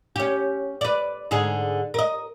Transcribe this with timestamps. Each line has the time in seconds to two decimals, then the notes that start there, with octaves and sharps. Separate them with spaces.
0.16 C#4 G4
0.81 B4 D5
1.31 G#2 D3 G#4
1.94 A#4 D#5